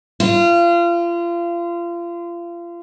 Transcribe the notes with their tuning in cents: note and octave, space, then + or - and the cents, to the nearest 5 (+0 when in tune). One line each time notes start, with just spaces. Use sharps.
F4 -30